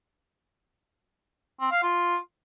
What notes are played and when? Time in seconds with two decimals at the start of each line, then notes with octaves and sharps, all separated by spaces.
1.60 C4
1.71 F5
1.83 F4